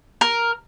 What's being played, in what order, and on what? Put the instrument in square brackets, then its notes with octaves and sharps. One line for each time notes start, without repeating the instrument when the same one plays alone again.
[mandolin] A#4